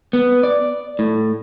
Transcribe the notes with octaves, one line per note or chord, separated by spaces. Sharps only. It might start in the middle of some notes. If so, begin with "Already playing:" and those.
B3
D5
A2